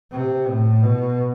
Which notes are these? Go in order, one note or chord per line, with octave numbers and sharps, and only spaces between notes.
C3
A2
B2